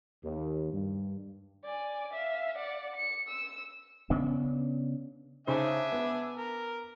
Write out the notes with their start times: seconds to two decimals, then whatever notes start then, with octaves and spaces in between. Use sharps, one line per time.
0.24 D#2
0.73 G2
1.65 D5 G#5
2.13 E5 F5
2.56 D5 F#5
2.96 C#7
3.28 E6
4.10 C#3 B3 C#4 D4
5.47 C#3 D4 D#4 C5 E5 G#5
5.92 B3
6.36 A#4